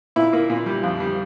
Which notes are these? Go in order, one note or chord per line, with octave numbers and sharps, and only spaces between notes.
A#2 E4
A#3
A#2
G3
F2
G3